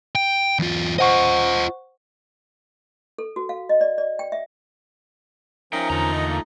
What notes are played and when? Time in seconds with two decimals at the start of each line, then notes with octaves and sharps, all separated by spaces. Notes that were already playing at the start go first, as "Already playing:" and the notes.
0.15 G5
0.59 E2 F4
0.98 F4 C5 D#5 F#5 C#6
3.18 A4
3.36 F#4
3.49 F5
3.69 D#5
3.81 D5
3.98 D5
4.19 G5
4.32 E5
5.73 F3 C#4 D#4 A#4 E5 G5
5.90 E2 D3 A3 F4 A#5
6.12 D#3 D#5
6.28 A#3